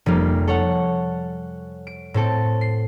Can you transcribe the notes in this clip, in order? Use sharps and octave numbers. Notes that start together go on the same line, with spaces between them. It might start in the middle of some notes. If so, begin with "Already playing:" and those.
F1 G3 A#3
A4 C#5 F#5
D7
A2 C4 A4 A5
C7